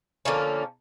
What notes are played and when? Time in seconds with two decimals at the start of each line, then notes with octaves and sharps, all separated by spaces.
0.25 D3 F3 A#3 C#4